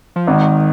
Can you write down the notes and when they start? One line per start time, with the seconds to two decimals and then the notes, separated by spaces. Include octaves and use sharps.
0.16 F3
0.27 G#1 D#3